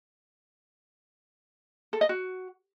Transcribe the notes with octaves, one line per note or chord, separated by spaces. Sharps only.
A4
D#5
F#4